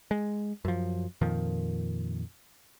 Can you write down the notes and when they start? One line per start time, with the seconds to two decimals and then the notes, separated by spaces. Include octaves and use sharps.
0.11 G#3
0.65 F#2 F3
1.21 F2 A#2 D#3 F3